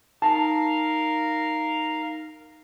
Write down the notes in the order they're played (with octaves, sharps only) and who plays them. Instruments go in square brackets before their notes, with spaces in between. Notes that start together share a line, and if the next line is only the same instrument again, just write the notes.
[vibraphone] D#4 [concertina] A#4 F5 [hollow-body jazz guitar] A5